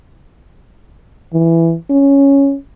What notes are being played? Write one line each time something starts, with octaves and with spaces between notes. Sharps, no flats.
E3
C#4